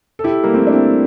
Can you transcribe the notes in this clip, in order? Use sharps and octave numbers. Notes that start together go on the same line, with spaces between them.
A4
E4 G4
G3 A#3
A3 C4
D4
C4 E4